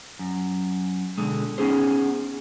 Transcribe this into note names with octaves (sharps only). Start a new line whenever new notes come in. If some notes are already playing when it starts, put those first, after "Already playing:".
F#2
B2 D3 G#3
B3 C#4 D#4 G#4 C5